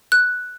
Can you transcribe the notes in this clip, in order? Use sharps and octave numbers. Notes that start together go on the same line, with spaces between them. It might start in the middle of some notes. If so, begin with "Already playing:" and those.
F#6